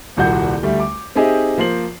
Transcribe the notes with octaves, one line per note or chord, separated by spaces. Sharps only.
D#1 C2 A#2 F#4 F#5 G6
D2 G3 A3
D6
C4 D#4 G4 G#4 D#5 E5
F3 A#3 C5 C7 F#7